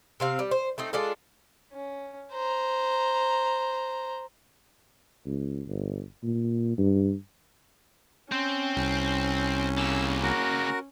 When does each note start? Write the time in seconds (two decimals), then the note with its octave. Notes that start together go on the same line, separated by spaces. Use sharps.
0.20 C3 C4 F5
0.39 G3
0.51 C5
0.78 A3 C4 D#4
0.93 G#3 D4 F4 A4
1.72 C#4
2.32 C5 A#5
5.26 C#2
5.67 G1
6.23 A#2
6.78 G2
8.32 C4 C#4 C5
8.76 C2
9.78 C#3 A#3 E6
10.23 F#4 A#4